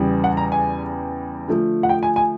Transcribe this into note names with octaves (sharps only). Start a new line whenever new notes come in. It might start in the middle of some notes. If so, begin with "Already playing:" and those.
Already playing: E2 C#3 E3 G3
F#5
A#5
G#5
D3 F3 A3
F#5
G5
G#5
G#5